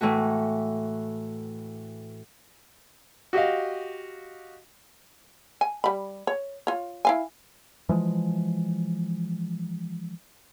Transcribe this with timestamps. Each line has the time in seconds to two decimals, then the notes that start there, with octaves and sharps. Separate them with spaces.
0.01 A2 E3 A3 F#4
3.33 F#4 G4 D#5 F5
5.61 G#5
5.84 G3 B5
6.27 C#5
6.67 F4 C#5
7.05 E4 F5 G#5
7.89 E3 F3 G#3